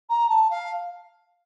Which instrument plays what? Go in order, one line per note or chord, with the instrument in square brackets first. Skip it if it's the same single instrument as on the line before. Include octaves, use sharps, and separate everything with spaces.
[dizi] A#5
A5
F5